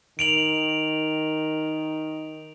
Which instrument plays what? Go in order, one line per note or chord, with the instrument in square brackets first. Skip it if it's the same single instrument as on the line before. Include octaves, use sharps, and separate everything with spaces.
[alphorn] D#3 [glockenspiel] D7 F7 F#7